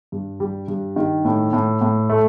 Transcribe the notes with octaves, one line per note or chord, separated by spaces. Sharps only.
G2
G3
G2
D#3
A2
A2
A2
A3